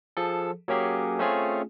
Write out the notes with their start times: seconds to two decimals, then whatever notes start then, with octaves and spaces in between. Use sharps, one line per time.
0.17 F3 G#4 A4
0.68 F#3 A#3 C#4 G4 G#4
1.19 A3 C4 C#4 F4 G#4